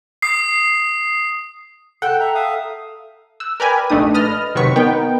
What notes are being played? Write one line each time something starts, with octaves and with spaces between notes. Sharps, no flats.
D#6 C7
A4 F#5 G5
E5 A#5
E5 F5 D#6
E6 F#6
A#4 B4 D5 G5 G#5 B5
A#1 A3 D4 D#4 D#6
B4 D#5 B5 F6 A6
C3 D#3 F#3 B4 C#6 B6
B3 D#4 A#4 G5